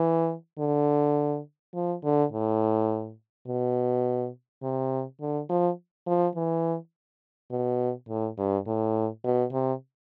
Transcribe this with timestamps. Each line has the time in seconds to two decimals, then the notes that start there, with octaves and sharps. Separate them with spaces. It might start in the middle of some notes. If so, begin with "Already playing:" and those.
Already playing: E3
0.59 D3
1.74 F3
2.04 D3
2.32 A2
3.47 B2
4.63 C3
5.21 D3
5.49 F3
6.07 F3
6.36 E3
7.51 B2
8.08 A2
8.38 G2
8.67 A2
9.24 B2
9.53 C3